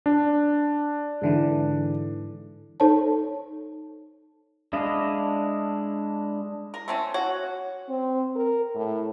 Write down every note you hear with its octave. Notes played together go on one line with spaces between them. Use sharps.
D4
G#2 D3 E3
D#4 A4 C5 C#5 A5
G#3 D4 E4 D#5 F5
A#4
A3 C4 C#4
F#4 C#5
C4
A#4
A2